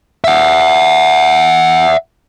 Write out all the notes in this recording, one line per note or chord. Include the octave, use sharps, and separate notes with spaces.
E5 F#5